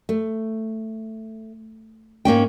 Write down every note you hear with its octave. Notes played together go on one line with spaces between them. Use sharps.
A3
G#2 A#3 C#4 G5